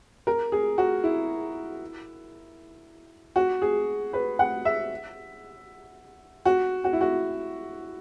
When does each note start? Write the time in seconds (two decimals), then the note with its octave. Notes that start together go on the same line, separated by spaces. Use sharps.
0.27 A#4
0.52 G#4
0.78 F#4
1.04 E4
3.36 F#4
3.62 G#4
4.13 B4
4.39 F#5
4.65 E5
6.46 F#4
6.84 F#4
6.93 E4
7.01 F#4